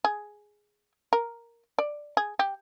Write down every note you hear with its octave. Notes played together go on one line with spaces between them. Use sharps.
G#4
A#4
D5
G#4
G4